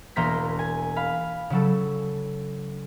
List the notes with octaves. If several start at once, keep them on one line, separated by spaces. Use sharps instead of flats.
E1 A#3 A#4 C6 G6 B6
G#5
F5 B5
C#3 F#3 A4